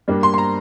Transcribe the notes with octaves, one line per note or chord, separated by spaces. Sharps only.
G2 G3 A#3 D4
C6
C6
A#5